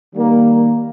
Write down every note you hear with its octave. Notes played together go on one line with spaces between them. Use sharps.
D#3 G3 A#3